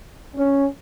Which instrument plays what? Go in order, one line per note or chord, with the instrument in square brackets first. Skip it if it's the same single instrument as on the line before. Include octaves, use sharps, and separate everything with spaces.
[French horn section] C#4